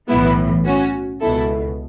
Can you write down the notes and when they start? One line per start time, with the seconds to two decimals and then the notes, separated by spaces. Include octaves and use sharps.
0.08 B1 A2 E3 B3 E4
0.65 C#4 F#4
1.21 C#2 B2 E4 A4